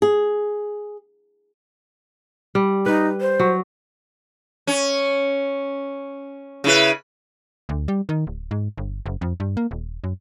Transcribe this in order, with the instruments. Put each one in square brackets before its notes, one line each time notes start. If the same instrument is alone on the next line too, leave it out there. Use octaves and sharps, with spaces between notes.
[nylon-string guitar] G#4
[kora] G3
[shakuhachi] D#4 [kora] B4
[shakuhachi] C5
[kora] F#3
[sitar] C#4
C#3 E4 B4
[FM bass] D2
G3
D#3
D1
G#2
G1
F#1
F2
G2
A#3
D#1
F#2